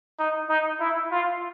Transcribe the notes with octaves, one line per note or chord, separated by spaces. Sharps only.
D#4
D#4
E4
F4